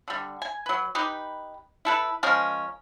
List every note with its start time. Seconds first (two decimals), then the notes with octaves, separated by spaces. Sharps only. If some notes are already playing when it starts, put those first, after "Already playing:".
0.08 D3 G3
0.42 G#5
0.66 F#3 B4
0.95 D#4 G4 B4
1.85 E4 A4 B4
2.23 F3 G#3 C#4 A#4